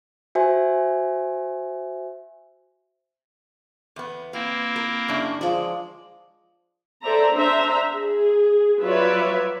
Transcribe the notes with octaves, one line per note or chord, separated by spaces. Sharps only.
F#4 C5 E5 G#5
E2 B3
A#3 C4 E4 F5
A#4
F#2 C#3 D4
F3 G#3 D5
A4 C5 D5 E5 A#5
D4 C5 E5 A#5
G#4
F#3 F4 B4 C#5 D5 E5